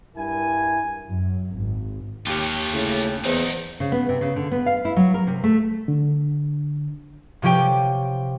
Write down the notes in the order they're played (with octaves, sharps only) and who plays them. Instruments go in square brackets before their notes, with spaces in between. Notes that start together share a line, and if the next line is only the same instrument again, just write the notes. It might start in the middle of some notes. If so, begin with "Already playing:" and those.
[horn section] G2 E4 A#4 G#5
[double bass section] F#2
G#1
[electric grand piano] D#2 G4 [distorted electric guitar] F4 C#5
[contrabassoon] A2 [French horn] C#3
[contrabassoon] E2 [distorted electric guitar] F#3 D#4 [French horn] C5
[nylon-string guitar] C#3
B3
C3
C#3
D3
B3
F5
E4
F#3
A#4
C3
A3
[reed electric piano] D3
[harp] C3 F3 C#4 G4 G5